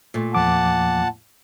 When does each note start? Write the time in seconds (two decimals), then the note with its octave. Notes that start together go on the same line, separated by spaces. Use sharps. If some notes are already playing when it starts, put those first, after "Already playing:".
0.14 A#2 A3
0.35 E2 F3 F#5 A5 D6